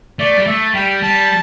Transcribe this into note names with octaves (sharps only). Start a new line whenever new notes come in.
A3 D5
G3
A3 E5
G3 G5
G3 A5